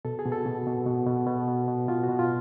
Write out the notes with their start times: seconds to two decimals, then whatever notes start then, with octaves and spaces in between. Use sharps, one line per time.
0.05 B2 A4
0.19 G#4
0.26 B2
0.32 A4
0.46 B2
0.67 B2
0.86 B2
1.07 B2
1.27 B2
1.48 B2
1.68 B2
1.88 B2 F4
2.03 F#4
2.09 B2
2.19 F4